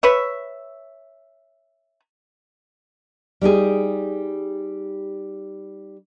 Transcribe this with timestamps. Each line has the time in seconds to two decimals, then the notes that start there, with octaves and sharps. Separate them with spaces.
0.03 B4 C#5 E5
3.41 G3 D#4 G4 G#4